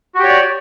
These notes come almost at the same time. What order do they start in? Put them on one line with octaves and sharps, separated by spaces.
F#4 G4 C#5 D5